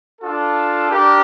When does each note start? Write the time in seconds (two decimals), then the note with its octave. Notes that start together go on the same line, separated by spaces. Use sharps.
0.21 D4 F4 A4
0.90 D4 G4 A#4